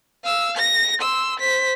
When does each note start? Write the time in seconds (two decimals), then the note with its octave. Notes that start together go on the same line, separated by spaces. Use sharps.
0.24 F5 E6
0.57 A#6
0.99 C6 E6
1.40 C5 B6